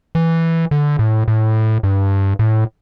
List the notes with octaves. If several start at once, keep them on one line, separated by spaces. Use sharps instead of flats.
E3
D3
A2
A2
G2
A2